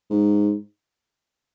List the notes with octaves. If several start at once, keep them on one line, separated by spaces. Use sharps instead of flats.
G#2